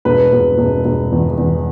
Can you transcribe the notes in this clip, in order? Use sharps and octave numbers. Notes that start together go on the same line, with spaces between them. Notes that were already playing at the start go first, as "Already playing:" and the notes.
E1 B4
E1
E1
E1
E2
E2